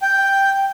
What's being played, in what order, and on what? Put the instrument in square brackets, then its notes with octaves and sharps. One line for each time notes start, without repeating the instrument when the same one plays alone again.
[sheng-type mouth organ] G5